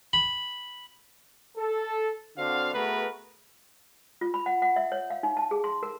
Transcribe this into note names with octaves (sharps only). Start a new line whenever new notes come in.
B5
A4
D3 C4 D4 F#4 F5
A3 B3 F#4 G#4 A#4 B4
F4
B5
F#5
F#5
E5
C#5
F5
D#4
A5
G#4
C6
A#4